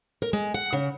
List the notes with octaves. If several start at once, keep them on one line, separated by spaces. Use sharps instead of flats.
A#4
G#3
F#5
C#3